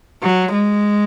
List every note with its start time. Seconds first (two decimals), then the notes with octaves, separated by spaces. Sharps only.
0.23 F#3
0.53 G#3